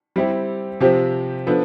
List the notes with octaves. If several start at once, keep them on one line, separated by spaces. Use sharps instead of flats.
G3 C4 E4 G4
C3 F3 C4 G4
F3 B3 D4 A4